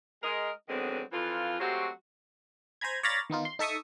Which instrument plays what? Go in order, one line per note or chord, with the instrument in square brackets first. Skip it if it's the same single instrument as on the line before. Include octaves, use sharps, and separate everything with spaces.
[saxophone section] G#3 A#4 D#5
D3 D#3 F#3 G#3 B3 C4
F2 E3 F3 F4
F#3 G#3 A3 C4 F#4 G4
[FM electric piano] C5 G#5 A#5 B5 G#6
C#5 D5 F5 A#5 B5 A6
D#3 B3 D#4 F4
C6
D#4 A4 E5 C#6 D#6